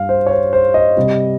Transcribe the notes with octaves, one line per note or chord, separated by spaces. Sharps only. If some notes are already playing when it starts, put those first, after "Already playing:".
Already playing: G2 G3 F5
C5
C#5
C5
C5
D#5
C3 G3